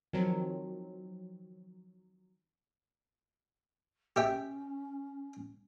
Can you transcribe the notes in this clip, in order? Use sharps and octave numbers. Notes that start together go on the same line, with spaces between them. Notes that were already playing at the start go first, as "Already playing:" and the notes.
D#3 F3 F#3 C4
C#4 G4 E5 G5